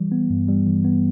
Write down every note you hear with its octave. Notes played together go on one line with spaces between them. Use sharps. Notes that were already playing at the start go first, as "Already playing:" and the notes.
Already playing: E3 G3
B3
G2
G3
E3
B3